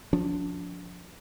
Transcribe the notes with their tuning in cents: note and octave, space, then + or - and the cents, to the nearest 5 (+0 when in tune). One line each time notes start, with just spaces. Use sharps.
F3 +25 D4 -35